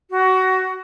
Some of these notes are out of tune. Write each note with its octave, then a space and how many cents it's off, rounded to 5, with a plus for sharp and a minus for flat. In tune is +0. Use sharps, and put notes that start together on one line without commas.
F#4 +20